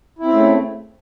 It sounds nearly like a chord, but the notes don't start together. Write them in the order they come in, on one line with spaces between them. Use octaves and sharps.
E4 C4 C#3 A3